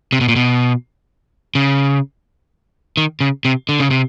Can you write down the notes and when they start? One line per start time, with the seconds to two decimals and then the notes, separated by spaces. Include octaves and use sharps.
0.12 C3
0.21 B2
0.29 A#2
0.36 B2
1.55 C#3
2.97 D#3
3.21 C#3
3.45 C3
3.69 D3
3.80 C#3
3.91 C3